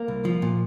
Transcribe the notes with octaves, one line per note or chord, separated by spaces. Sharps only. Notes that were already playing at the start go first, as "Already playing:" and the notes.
Already playing: A#3
C2
F3
A#2